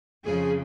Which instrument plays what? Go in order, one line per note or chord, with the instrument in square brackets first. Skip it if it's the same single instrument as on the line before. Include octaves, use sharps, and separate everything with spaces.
[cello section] F2 C#3 F3 G#4